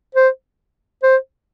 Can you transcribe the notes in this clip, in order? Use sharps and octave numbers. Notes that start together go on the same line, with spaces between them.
C5
C5